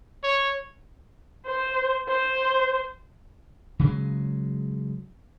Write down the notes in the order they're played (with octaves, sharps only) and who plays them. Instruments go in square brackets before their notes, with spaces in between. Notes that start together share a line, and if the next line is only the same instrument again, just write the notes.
[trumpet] C#5
[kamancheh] C5
C5
[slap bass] C#3 F#3 G#3